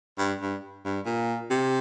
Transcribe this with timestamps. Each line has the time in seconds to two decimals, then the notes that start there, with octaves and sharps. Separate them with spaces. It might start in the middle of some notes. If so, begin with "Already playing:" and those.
0.18 G2
0.41 G2
0.85 G2
1.06 A#2
1.50 C3